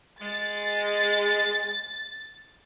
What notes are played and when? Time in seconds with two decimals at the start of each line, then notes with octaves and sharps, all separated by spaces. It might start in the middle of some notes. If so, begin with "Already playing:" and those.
0.20 G#3 A6